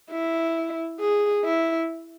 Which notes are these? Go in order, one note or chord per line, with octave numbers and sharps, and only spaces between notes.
E4
G#4
E4